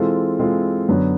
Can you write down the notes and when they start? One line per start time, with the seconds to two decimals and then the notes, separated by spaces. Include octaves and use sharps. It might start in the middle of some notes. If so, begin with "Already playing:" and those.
Already playing: E3 G#3 C4 F4 A4
0.39 E3 G#3 C4 F4 A4
0.89 F#2 D3 F#3 B3